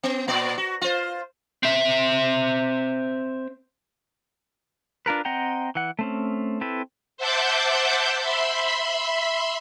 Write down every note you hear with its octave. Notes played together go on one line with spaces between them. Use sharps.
B3
A#2 B3 D5
F#4
F4 C5
C4 E5
D4 F4 A#4 B4
C4 D#5 F#5 G5 A#5
E3 F#5
A3 C4 C#4
C4 E4 A4 B4
C5 E5 F#5 A5 D6 G6
E5 B5 C6